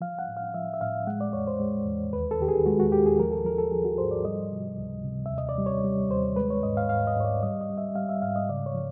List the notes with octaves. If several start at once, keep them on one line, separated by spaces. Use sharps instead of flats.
F3 F5
F#5
A2
F5
F3 E5
E5
A2 F5
G#3 F#5
D5
E2 C#5
C5
G#3
E2
D#2 B4
A4
D#3 G4
G#4
G#3 F#4
F#4
D#2 G4
G#4
F3 A#4
A4
F3 A#4
A4
F3 G#4
F#4
G#2 C5
D5
G3 D#5
C3
C#2
C3
D#2 E5
D#5
D5
G3
C#5
G3
D#2 C5
G#3 B4
C#5
G#2 D#5
F5
G#2 F5
D#5
G#2 C#5
D5
G3 D#5
D#5
G3
E5
G3 F5
E5
G#2 F5
D#5
C#3 D5
C#5
F3